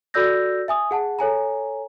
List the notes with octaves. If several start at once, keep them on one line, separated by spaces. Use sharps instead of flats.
F#4 A4 D5 E6 G6 A#6
E5 G#5 D#6
G#4 F#5 A5
A4 C#5 G#5 A#5